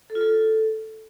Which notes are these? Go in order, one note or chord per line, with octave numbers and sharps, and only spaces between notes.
A4
F4
A4